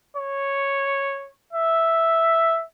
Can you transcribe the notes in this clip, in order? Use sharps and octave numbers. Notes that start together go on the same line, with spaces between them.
C#5
E5